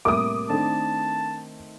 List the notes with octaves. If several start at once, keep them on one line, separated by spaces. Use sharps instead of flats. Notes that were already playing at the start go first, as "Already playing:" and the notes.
C2 A2 A#3 E5 D6 D#6
D#3 A3 C4 D4 A5